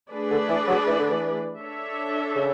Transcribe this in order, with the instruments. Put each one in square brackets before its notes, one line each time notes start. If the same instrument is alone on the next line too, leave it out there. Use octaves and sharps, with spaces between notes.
[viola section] A3 D4 G#4 B4 D5
[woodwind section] D3
E3
F#3
E3
D3
E3
[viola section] D4 A4 C#5 E5
[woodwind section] C#3